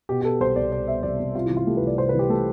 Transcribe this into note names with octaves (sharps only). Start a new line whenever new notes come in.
B2 G4
G4
B3 A4
C2 C5
C2 D5
B2 D5
B3 E5
C2 D5
C2
C3 F4
E3 E4
F4
A3 G4
C2 B4
D5
C3 C5
E3 B4
G4
A3 A4